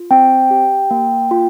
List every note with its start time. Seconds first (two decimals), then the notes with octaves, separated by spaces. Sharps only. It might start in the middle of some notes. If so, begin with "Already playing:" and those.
Already playing: F4
0.11 C4 G5
0.51 G4
0.91 A#3
1.31 F4